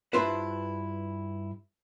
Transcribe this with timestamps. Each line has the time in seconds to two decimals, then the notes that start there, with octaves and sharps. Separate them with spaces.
0.13 G2 D4 E4 F4 B4 C5